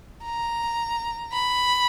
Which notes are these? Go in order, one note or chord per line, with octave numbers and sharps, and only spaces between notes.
A#5
B5